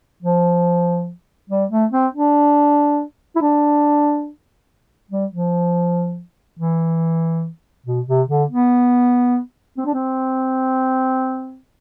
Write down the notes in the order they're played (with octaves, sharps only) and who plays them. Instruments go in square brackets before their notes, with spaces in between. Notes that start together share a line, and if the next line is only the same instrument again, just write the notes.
[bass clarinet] F3
G3
A3
C4
D4
E4
D4
G3
F3
E3
B2
C3
D3
B3
C4
D4
C4